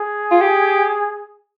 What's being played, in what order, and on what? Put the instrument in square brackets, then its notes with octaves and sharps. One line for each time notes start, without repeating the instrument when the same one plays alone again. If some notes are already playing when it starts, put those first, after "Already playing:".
Already playing: [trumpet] G#4
[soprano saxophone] F4
G4